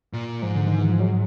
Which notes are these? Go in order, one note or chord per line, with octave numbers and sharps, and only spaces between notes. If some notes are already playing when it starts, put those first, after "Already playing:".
A#2
G#2 F3
D3
D#3
E3
F3
F#3